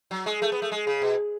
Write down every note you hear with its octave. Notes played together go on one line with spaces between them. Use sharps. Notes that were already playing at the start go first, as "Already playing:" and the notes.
F#3
G#3
A3
B3
A3
G#3
C#3
B2